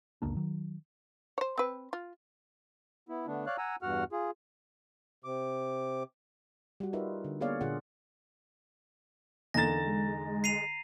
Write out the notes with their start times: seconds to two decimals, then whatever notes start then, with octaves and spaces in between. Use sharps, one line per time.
0.22 F#1 C#2 A#3 D4
0.37 D#3 F#3
1.38 C5 C#5
1.58 C4 B4
1.93 F4
3.09 B3 E4
3.27 D3 A3 B3 D4
3.46 C#5 D5 F5 F#6
3.58 F#5 G#5 A#5 E6
3.82 E2 G2 F#4 F#5 F6
4.12 F4 G#4
5.24 C3 D6
6.80 G3 F#4
6.93 D#4 F4 A#4 B4 E5
7.24 D3
7.40 A#3 B3 G#4 C#5 D5 F5
7.61 A#2 D3 F4 G#4 F#5
9.54 E2 D3 A#3 D#4 G#5 A#5 A6 A#6
9.86 G#3
10.44 C7 D#7 F7